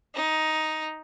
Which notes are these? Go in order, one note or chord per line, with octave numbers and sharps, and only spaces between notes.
D#4